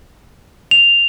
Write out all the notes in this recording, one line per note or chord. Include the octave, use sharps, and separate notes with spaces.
F7